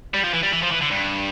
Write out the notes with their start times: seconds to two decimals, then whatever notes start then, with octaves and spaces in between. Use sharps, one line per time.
0.14 G3
0.24 F3
0.33 E3
0.43 G3
0.52 E3
0.62 F3
0.71 E3
0.81 D3
0.91 G2